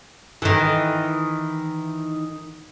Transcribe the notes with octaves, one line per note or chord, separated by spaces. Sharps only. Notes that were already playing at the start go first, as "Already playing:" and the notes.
D#3 E3